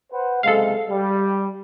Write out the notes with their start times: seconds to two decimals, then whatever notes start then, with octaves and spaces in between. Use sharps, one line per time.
0.12 B4 C5 F#5
0.43 F#1 C3 G#3 A4 F5
0.89 G3